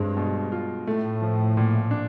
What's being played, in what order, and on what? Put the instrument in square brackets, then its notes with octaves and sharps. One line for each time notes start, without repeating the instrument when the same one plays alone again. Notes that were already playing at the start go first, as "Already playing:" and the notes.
Already playing: [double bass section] G2 [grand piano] G#3 C4
[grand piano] B2
F4
[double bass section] A2 [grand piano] A3
[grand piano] F3
A#2
D4